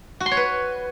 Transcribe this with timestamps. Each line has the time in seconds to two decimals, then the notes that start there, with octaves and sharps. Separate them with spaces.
0.20 F#4
0.26 C6
0.31 C#5
0.37 B4